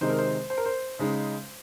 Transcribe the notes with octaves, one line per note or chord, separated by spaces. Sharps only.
C3 D#3 G#3 D#4 C5
A#4
C5
C5
A#4
C5
C#3 G#3 D#4